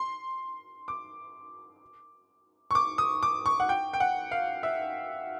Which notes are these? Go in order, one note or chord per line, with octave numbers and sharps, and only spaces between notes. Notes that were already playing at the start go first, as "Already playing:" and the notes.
Already playing: C6
D6
C#6
D6
D#6
D6
C#6
F#5
G5
G5
F#5
F5
E5